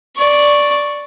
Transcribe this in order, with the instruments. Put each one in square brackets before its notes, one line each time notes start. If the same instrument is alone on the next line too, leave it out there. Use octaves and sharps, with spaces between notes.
[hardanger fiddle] D5 C#6